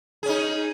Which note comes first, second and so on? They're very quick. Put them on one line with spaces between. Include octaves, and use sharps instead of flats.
G#4 C#4 D#4